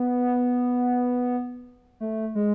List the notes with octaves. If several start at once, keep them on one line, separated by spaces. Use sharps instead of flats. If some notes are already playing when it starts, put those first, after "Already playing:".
Already playing: B3
A3
G#3